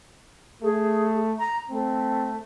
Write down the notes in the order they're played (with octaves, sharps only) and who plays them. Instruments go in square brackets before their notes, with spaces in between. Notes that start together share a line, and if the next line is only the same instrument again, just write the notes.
[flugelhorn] A3 [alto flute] G#4
[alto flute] A#5
[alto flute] A3 [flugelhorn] C4